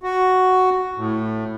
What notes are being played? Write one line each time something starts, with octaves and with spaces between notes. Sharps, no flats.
F#4
A2